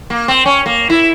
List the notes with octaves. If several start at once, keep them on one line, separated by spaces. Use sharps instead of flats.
A#3
C4
C#4
A#3
E4